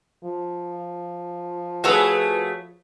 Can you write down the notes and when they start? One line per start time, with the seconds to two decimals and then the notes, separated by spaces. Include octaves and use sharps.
0.24 F3
1.84 A3 F#4 G#4 B4 C#5 E6